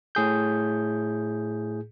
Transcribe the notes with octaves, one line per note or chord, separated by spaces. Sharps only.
A2 G#4 G6